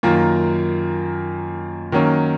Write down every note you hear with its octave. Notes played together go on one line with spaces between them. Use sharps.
F#2 D#3 A#3 F4
D#3 F#3 A#3 C#4